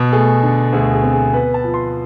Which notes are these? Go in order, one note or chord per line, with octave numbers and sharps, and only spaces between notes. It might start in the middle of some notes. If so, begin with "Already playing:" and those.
Already playing: B2
A3 G#4
D3
D2 G#4
G#4
C4
G#4
B3 B4
A5
F3
C6